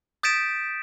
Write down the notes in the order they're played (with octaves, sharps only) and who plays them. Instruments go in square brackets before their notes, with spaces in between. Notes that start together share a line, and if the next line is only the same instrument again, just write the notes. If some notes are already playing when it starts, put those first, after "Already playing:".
[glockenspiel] D#6 G6 A6 B6 D7 E7